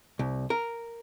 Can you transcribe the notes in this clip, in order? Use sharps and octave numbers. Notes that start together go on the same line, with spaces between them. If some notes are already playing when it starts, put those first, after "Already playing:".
C2
A#4